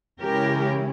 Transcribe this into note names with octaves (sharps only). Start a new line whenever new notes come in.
C#3 E3 G#3 C#4 E4 G4 A#4